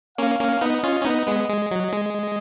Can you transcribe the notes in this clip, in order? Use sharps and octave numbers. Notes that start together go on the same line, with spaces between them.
A#3 C#4 F5
A#3 C#4
B3 D#4 D#5
C#4 F4
C#4
B3 D#4
G#3 B3
G#3
F#3
G#3